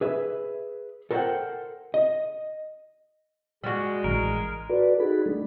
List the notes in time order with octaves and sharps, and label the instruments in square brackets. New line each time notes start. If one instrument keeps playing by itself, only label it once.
[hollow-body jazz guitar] G#4 B4 E5
A4 A#4 C5 C#5 F#5 G5
D#5
[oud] G3 F#4 [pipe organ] G#3
[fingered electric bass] A1 E3 [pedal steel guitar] A#4
[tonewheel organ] F#4 A4 B4 D5
D#4 F#4 G#4 A4 B5
G3 A3 D4